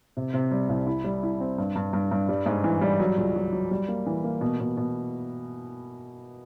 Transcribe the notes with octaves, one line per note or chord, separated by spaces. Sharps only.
C3
C3
G3
C2
E4
G3
E4
C4
G2
G2
G2
G2
G3
G#2
E3
G3
F#3
C#2
F#3
F#3
G3
A#3
E3
A#3
B2
B2
B2